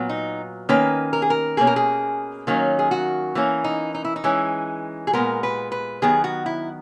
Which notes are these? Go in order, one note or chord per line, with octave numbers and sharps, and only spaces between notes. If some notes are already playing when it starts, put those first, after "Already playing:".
Already playing: A#2 F#3 B3
D#4
D#3 A#3 C#4 B4
A#4
G#4
A#4
B2 A#3 C#4 G#4
A#4
G#4
D#3 F#3 A#3 C#4
G#4
F#4
E3 A#3 C#4
D#4
D#4
E4
D#4
E3 G#3 C#4
G#4
A#2 G#3 B3 A#4
B4
B4
D#3 F#3 B3 G#4
F#4
E4